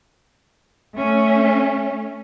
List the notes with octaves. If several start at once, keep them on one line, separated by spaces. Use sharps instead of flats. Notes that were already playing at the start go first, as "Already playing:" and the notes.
A3 C#4